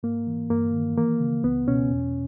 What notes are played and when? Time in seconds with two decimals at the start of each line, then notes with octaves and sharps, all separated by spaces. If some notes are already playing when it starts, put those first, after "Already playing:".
0.03 G#2 A#3
0.27 E3
0.50 G2 A#3
0.73 D#3
0.97 E3 A#3
1.20 C#3
1.44 C#2 B3
1.67 B2 C#4
1.91 E2